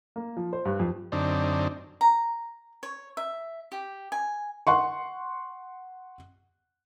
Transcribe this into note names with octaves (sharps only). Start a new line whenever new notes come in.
A#3
F3
C5
G2
F2
F#2 D3 C4 D4 D#4
A#5
C#5
E5
G4
G#5
F#5 C6 C#6